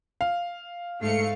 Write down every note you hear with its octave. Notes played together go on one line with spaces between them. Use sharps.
F5
G#2 A3 F5 C#7